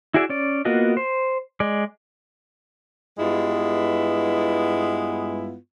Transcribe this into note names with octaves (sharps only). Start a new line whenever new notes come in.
E4 F#4 G#4 D5 E5
C#4 D5
A#3 B3 F4 F#4 D#5
C5
G#3 D5
G2 G#3 B3 E4 F4